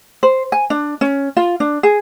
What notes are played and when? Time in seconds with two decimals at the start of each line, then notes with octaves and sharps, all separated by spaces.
0.23 C5
0.52 G#5
0.70 D4
1.01 C#4
1.37 F4
1.60 D4
1.83 G#4